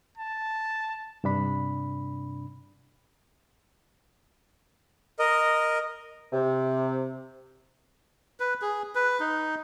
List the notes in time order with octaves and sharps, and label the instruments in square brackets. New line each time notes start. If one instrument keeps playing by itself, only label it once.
[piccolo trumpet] A5
[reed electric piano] G2 C3 D4 B5
[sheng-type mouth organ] A#4 D#5
[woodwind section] C3
[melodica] B4
G#4
B4
D#4